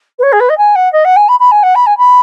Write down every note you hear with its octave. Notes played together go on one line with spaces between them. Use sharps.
B4
C#5
G#4
B4
D#5
G#5
F#5
D#5
F#5
G#5
B5
B5
G#5
F#5
B5
G#5
B5